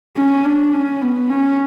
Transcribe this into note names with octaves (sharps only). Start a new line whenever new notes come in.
C#4
D4
C#4
B3
C#4